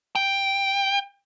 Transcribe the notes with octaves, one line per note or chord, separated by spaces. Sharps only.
G5